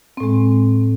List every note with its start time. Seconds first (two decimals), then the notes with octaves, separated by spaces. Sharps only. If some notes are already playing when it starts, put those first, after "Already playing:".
0.17 C4
0.20 A2
0.23 G#3